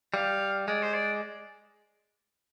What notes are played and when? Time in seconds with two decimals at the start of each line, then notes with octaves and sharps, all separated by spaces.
0.14 G3 F5
0.68 G#3 D5
0.82 C5
0.94 D5